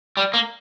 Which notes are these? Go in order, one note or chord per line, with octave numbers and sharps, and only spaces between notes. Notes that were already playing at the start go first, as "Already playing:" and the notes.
G3
A#3